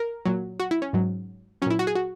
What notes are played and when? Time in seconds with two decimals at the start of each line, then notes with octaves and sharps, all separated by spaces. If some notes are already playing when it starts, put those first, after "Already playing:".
Already playing: A#4
0.25 A#2 F#3
0.60 F#4
0.71 E4
0.82 C#4
0.93 G#2 F#3
1.62 F#3 C#4
1.66 A#2 E4
1.79 F#4
1.87 G#4
1.95 F#4